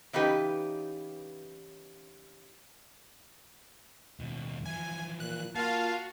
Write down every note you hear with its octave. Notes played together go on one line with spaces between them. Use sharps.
C#3 E3 B3 D#4 G4 B4
D#2 B2
E3 F3 G#5
A#2 F#6
A#3 F4 F#4 F5 A5